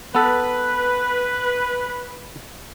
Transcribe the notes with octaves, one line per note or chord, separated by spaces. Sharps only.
B3 A4 B4